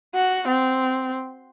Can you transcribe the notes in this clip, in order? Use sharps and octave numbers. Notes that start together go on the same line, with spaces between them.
F#4
C4